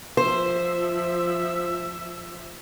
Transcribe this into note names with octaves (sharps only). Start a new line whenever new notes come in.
F3 C5 E5